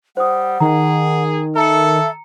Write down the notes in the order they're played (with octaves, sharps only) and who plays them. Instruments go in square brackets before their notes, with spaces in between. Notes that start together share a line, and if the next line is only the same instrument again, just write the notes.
[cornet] G3 [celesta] C5 D#6 [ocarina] F#5
[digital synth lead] D#3 [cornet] G#4 [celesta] A#5
[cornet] A4 [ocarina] E5 [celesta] A#5 C#7